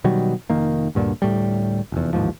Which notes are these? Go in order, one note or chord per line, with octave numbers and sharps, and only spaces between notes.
B2 D#3 F#3 G3
F1 D#3 A#3
D2 G2 A#2 D3
D2 A2 G3
F1 E2
A1 D#2 G#2 F3